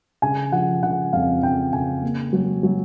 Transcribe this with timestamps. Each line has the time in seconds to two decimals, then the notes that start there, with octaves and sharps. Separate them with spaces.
0.22 C#3 G#5
0.52 F3 F#5
0.82 C#3 F#5
1.13 F2 F5
1.42 C#3 G5
1.73 C#3 G#5
2.03 A#3
2.33 F#3
2.63 F#3